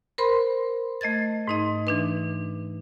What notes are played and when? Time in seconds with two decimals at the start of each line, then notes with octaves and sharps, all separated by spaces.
0.18 A#4 C5 B5 C6
1.01 A3 D#5 G#6 A6
1.48 G#2 D#4 D#5
1.87 E3 D4 B4